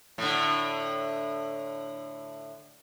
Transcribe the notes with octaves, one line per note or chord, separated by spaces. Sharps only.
A2 D3